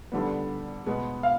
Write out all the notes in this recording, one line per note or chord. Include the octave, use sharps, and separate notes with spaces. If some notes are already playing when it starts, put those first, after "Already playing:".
D3 G3 B3
B2 G#3 B3
F5